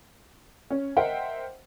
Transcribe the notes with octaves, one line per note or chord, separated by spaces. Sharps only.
C#4
A#4 C5 D#5 E5 F#5 G5